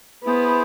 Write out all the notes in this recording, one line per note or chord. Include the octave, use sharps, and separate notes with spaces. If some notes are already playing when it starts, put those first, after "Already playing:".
B3 E4 G#4 C5